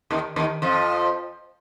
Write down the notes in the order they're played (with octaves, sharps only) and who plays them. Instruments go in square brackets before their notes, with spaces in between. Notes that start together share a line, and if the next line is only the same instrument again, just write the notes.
[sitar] D#2 D#3
D#2 D#3
F2 F3